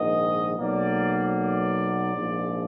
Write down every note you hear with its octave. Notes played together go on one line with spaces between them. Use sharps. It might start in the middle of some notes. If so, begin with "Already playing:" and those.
Already playing: A#1 G#2 D#3 D#5
B1 B2 F#3 A#3 D5
D5
A#1 G#2 F3